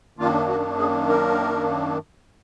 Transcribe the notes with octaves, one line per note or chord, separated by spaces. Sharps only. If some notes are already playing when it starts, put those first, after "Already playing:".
F#2 D#3 A#3 D4 F4
F#4
G#4
A#4